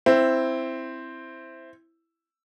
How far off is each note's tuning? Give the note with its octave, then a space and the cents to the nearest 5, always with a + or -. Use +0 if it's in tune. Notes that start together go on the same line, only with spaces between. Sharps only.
C4 +0 E4 +5